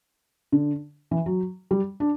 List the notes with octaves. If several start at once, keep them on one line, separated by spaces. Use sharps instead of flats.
D3
E3
F#3
G3
D4